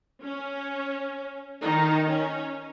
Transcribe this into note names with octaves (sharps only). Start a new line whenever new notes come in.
C#4
D#3 D#4
C#4